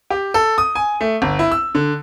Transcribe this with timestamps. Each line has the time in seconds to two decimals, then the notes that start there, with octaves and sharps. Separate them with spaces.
0.10 G4
0.34 A4
0.58 D#6
0.75 G#5
1.01 A3
1.22 G1
1.39 E4
1.51 E6
1.75 D3